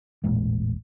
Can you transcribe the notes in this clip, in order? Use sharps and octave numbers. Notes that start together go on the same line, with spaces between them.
E1 A1 A#2 G#3